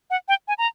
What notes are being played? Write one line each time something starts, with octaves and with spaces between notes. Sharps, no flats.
F#5
G5
G#5
A#5